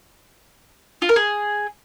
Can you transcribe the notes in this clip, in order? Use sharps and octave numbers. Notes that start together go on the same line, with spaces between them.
F4
A#4
G#4